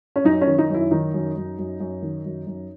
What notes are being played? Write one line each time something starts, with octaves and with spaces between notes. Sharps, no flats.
C#4
F#2 D#4
C#4
D#3
D#4
F#2 E4
D#3 D#4
F#2
F#2
F#2
F#2
D#3
F#2
F#2